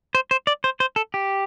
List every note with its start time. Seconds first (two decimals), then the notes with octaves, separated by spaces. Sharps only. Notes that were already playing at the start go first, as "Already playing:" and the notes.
0.15 C5
0.31 C5
0.47 D5
0.64 C5
0.80 C5
0.96 A4
1.14 G4